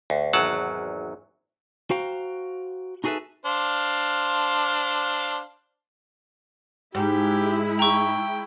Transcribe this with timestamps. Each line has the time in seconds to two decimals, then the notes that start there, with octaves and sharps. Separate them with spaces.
0.10 D2
0.33 G#1 E2 F#3 F#5 A5
1.91 F#4 C5 F5 G5 A#5
3.04 D#4 F#4 G#4 A4 B4 E5
3.46 D4 C5 F5
6.95 G#2 G#3 E4 G4
7.79 G5 A#5 C#6